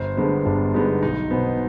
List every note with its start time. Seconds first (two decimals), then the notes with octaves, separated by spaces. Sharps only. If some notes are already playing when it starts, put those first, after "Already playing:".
Already playing: G1 C5
0.17 G2 D3 G#3 B3 C5
0.45 G1 D4
0.74 G2 D3 G#3 B3 D#4
1.03 B1 D#4
1.31 B2 B3 C5